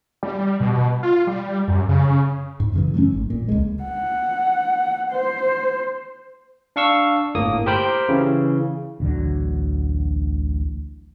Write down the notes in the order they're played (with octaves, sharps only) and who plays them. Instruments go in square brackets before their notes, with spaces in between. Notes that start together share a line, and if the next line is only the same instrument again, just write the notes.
[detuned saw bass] G3
B2
F4
G3
F#2
C#3
[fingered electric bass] G#2
F#2 C#3 E3
F#3 A3 C4 C#4
G#1
A#2
C#2 G#3
[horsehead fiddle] F#5
C5
[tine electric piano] D4 F5 C#6 E6
G1 A2 A#3 D#6
G4 A#4 C5 G5 B5
C#3 E3
[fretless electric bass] A1 D2 D3 F#3